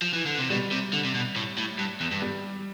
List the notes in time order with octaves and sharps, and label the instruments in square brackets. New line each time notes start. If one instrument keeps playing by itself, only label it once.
[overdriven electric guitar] F3
E3
D3
C3
[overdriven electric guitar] B2 [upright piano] G3
[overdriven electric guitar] C3
D3
C3
B2
A2
A2
G2
E2
G2
[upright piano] G3